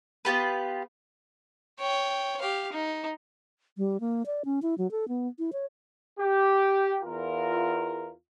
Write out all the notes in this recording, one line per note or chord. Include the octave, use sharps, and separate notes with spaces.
B3 F4 G4 B4
C#5 G5
G4 F5
D#4
G3
A#3
D5
C#4
E4
F#3
A4
B3
E4
C#5
G4
E2 F4 A#4